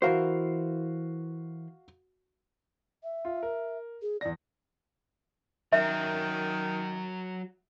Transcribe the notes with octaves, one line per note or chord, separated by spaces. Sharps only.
E3 F#4 A#4 C5 F5
E5
F4
A#4
G#4
E2 D5 A#6
D#3 F#3 A#4 E5